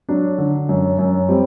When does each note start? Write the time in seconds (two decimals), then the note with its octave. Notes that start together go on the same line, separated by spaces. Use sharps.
0.09 F#3 D4
0.38 D3
0.69 F#2
0.99 F#2
1.29 G3 C4